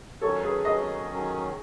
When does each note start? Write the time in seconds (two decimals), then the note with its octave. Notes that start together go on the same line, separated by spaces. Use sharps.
0.21 D#3 F#3 C#4 A4 C#5
0.43 G#4 B4
0.65 D#3 F#3 C#4 B4 D#5
1.09 D#3 F#3 C#4